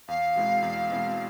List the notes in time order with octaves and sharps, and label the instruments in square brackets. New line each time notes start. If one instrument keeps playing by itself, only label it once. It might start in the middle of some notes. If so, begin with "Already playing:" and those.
[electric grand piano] E2 [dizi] F5
[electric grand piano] B2 G#3 C4 E4
E2
B2 G#3 C4 E4